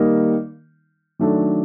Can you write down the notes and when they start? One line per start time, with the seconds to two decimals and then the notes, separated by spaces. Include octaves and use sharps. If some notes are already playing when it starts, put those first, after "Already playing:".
Already playing: D#3 G3 A#3 D#4
1.19 D#3 F#3 A3 D4